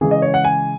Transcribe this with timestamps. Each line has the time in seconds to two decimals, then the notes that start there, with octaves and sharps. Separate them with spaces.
0.01 C#3 E3 G#3 G#4
0.11 D#5
0.22 C#5
0.34 F#5
0.45 G#5